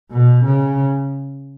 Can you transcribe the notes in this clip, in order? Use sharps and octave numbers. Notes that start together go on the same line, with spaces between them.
B2
C#3